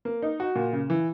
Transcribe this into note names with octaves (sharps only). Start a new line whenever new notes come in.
A#3
D#4
F#4
A#2
C#3
E3